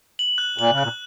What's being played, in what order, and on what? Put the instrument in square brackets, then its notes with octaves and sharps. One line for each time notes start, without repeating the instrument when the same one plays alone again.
[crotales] F#7
F#6
[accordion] A#2 [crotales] F#7
[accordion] C#3
[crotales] F#6
[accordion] A#2